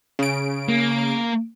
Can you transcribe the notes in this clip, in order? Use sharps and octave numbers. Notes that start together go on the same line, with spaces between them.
C#3 D7
A#3